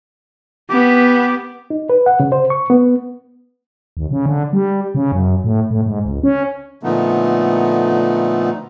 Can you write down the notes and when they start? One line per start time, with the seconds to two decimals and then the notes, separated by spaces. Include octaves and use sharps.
0.70 B3 G4
1.70 D#4
1.90 B4
2.06 F#5
2.20 C#3
2.32 C5
2.50 C#6
2.70 B3
3.97 D#2
4.11 C#3
4.26 D3
4.53 G3
4.95 C#3
5.12 F#2
5.44 A2
5.71 A2
5.86 G#2
6.05 C#2
6.23 C#4
6.83 A#2 D3 F3 A3 B3 D#4